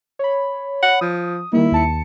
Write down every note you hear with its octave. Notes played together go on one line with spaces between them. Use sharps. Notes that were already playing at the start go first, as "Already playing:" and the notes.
C#5 B5
F#5
F3 D#6
D#3 G3 A#3 E4
D#2 A5 C#7